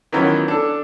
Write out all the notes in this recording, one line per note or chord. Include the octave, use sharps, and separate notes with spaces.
D#3 E3 F#3 B3 C#4 F4
D4 A4